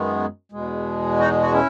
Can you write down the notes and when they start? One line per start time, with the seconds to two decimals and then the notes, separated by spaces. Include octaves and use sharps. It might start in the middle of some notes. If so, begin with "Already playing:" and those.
Already playing: F#2 D#3 G#3 B3
0.52 E2 B2 G#3
1.19 D#4 F#4
1.42 F#4
1.52 C#4 E4